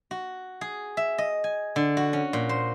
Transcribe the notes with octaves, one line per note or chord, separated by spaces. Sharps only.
F#4
G#4
E5
D#5
G#5
D3
F#4
C#4
A#2
C5